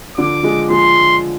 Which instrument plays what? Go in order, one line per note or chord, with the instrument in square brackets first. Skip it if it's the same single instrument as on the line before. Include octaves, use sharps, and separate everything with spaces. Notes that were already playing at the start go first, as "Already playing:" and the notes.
[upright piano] D3 F3 [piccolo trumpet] D6
[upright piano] F3 G#3
[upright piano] F3 G#3 [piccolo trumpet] C6